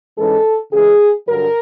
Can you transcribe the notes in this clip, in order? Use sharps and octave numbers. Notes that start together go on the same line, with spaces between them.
G#2 E3 G#3 C#4 A4
C#3 E3 G#3 G#4
G2 D3 F#3 A#4